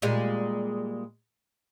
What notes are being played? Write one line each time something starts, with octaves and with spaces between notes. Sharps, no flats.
A#2 G3 G#3